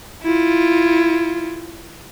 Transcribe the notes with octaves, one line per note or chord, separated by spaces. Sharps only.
E4 F4